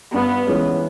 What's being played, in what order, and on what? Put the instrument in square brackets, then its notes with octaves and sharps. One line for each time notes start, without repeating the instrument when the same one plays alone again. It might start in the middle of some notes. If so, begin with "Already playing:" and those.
[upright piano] G2 [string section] B3
[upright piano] E3 G#3 C#4